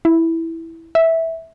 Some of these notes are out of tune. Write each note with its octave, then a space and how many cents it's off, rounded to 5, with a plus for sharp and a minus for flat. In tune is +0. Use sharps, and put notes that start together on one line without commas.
E4 -5
E5 -10